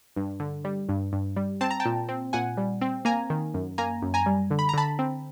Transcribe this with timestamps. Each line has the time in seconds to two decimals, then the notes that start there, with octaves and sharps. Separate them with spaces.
0.16 G2
0.40 D3
0.65 G3
0.89 G2
1.13 G2
1.36 G3
1.61 C4 A5
1.71 A#5
1.80 G5 A5
1.85 A#2
2.09 C4
2.33 A#2 F#5 G#5
2.57 G3
2.81 C4
3.05 A#3 G#5 A#5
3.30 D#3
3.54 F#2
3.78 A#3 G#5 A#5
4.02 F#2
4.14 G#5 A#5
4.26 G3
4.51 D3
4.59 B5
4.69 A#5
4.74 D3 A5 B5
4.99 C4